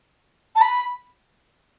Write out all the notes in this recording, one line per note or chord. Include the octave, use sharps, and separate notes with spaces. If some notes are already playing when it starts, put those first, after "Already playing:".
A5
B5